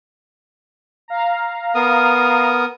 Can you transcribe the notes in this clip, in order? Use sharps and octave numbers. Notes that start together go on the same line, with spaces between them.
F5 A#5
B3 A#4 D#6